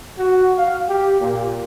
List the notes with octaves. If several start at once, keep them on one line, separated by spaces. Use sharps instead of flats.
F#4
F5
G4
A#2